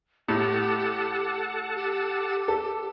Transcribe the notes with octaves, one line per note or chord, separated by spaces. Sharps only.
A2 G4 A4 F#5 A5
G4
A4